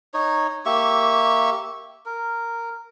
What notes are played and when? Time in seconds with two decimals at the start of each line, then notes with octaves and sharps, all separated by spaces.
0.14 D#4 C#5
0.66 A#3 G4 E5 C#6
2.06 A#4